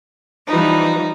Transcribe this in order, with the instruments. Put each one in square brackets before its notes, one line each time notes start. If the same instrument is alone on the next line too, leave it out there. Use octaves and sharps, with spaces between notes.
[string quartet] E3 F3 G3 [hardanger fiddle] D#4